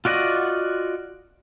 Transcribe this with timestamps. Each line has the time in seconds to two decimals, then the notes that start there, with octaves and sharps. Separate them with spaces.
0.05 F4 F#4 D5 D#5 F#5